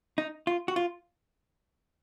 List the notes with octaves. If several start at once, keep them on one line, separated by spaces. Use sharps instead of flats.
D#4
F4
F#4
F4